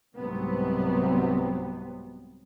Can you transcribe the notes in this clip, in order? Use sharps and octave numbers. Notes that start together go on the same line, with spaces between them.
C2 G#2 C3 F#3 B3 C4